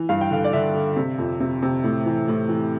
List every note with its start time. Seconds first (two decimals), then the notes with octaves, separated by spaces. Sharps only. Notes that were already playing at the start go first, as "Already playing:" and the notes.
Already playing: E3
0.09 G2 F5
0.21 G5
0.31 D3 F5
0.44 D5
0.53 D3 E5
0.74 D3
0.97 C3
1.18 F2
1.40 C3
1.63 C3
1.84 A2
2.06 E3
2.28 A2
2.49 E3